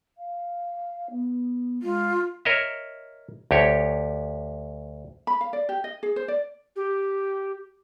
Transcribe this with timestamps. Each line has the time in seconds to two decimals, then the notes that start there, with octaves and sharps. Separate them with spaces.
0.17 F5
1.10 B3
1.83 G#3 F4
2.45 A#4 C#5 D#5 E5
3.51 D2 G4 C#5
5.27 B5
5.41 F5
5.53 D5
5.69 G4
5.84 D#5
6.03 G#4
6.16 C5
6.28 D5
6.76 G4